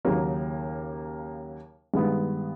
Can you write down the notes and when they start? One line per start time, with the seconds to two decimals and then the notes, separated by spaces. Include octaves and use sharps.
0.05 D#2 C#3 F#3 A#3
1.94 G2 D#3 G#3 B3